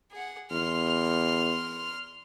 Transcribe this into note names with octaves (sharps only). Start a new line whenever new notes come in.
G#4 F#5
E2 C6 F6